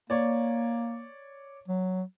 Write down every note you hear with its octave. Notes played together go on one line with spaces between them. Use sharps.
A#3 C#5 D5
F#3